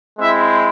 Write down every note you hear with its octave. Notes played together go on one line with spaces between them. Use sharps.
G#3 C4 E4 E5